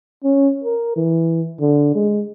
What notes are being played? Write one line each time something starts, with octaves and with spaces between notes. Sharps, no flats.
C#4
A#4
E3
D3
G#3